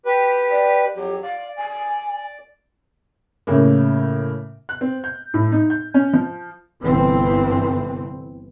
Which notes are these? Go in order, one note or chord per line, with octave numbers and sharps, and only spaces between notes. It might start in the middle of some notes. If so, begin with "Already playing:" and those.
G4 B4
D5
F2 F#3 G4
D5 F5
G#5
A2 C#3 A#3
F#6
C4
G6
A2
D#4
G6
C#4
F3
G1 C2 E3 C4